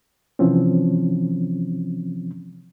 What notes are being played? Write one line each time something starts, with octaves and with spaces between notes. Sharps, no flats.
C3 E3 F3 C4 C#4